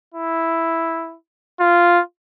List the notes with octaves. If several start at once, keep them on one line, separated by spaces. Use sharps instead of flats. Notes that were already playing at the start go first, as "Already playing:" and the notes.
E4
F4